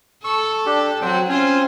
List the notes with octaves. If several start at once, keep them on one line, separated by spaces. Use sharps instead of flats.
A4 C#6 E6
D4 G4
F#3 C4 F#4 G5
C4 C#4 F4 C5 G#5